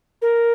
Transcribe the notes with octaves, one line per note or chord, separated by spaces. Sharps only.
A#4